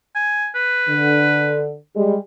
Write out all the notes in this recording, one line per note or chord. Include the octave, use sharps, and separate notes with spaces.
G#5
B4
D3
G3 G#3